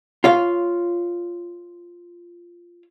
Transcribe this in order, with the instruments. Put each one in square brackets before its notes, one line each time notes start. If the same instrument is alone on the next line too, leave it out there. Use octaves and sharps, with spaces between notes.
[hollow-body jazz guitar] F4 C#5 F5